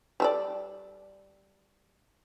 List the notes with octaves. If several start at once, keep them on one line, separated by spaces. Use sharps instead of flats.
G3 A4 D5